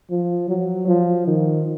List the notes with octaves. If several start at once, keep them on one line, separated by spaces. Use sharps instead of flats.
F3
F#3
F3
D#3